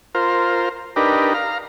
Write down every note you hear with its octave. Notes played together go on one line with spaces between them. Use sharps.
F4 A#4 C5
D4 D#4 G4 A#4 B4
F5 A#5